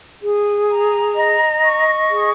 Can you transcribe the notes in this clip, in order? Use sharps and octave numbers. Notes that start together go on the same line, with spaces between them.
G#4
A#5
D#5
C#6
G#4